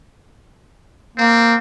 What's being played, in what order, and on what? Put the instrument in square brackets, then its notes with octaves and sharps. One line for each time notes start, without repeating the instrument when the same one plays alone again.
[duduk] A#3 [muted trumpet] C4